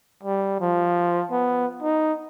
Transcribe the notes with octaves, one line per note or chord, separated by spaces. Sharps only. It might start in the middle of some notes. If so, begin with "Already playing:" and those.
G3
F3
B3
D#4